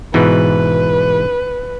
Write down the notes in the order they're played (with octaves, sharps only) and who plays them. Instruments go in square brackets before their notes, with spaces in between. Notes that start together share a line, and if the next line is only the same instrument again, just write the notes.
[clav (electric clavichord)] G#2 B2 E3 [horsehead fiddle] B4